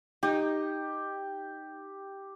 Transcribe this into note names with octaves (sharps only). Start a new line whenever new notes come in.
D#4 G4